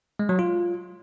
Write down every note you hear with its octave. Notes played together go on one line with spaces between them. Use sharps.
G#3
F#3
F4